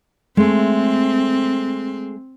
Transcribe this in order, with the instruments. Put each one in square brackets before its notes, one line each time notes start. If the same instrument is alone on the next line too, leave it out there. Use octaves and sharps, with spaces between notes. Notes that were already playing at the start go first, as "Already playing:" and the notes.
[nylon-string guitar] G#3 A3 [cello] C4